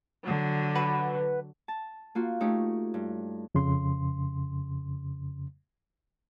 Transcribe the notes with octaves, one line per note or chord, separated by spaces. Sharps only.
D3 F#3
B4 F#5
A5
A#3 F4 F#4
A3 D#4 G4 C#5
G2
F2 C#3 C6